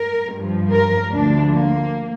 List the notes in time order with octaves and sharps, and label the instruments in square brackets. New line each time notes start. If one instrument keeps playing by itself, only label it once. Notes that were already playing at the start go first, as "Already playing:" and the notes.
Already playing: [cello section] A#4
G2 F3
A#4
D2 D3 F3 D4
A#3